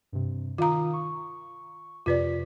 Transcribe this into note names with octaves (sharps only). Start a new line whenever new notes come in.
G2 C3
D#3 F4 F5 A#5 D#6
C#6
F2 C3 F4 B4 D5 B6